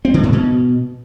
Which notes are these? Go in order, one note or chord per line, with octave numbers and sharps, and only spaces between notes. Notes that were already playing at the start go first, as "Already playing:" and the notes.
C4
D3
G#2
B2